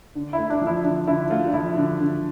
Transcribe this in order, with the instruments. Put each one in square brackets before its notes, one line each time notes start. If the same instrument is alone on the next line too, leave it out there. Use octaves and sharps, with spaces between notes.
[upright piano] D3
[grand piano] E4
[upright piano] A3
[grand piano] D4
[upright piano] F3
[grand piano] E4
[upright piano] D3 [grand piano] D4
[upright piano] D3 [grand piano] E4
[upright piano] A3 [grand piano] F4
[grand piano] D4
[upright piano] F3 [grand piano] E4
[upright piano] D3
D3